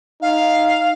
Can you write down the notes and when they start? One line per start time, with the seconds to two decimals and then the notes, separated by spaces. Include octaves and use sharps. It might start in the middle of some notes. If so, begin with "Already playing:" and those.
0.22 D#4 F5